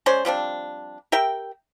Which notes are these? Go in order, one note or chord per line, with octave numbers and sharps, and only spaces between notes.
G#3 C#4 C5 D5
F3 G3 C4 D4
G4 A#4 E5 G5